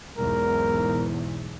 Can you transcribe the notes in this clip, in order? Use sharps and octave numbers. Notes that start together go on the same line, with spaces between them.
B1 E2 G#2 A#4